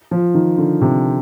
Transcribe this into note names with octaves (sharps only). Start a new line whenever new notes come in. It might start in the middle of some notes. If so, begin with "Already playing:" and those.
F3
D#3
D3
C3